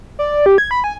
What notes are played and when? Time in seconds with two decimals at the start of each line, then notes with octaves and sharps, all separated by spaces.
0.19 D5
0.46 G4
0.58 G#6
0.71 B5
0.84 G#5